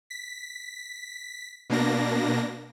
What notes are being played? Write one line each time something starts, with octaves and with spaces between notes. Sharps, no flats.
B6
B2 A#3 D4 A#6